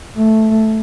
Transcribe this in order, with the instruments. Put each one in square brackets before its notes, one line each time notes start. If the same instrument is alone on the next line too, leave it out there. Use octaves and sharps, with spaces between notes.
[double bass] A3